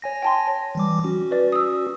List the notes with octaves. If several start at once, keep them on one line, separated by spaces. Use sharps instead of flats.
C#5 G#5 A#6
G5 A5 C6
E3 G3 D6
C#4 F#4
B4 D5
D#6 E6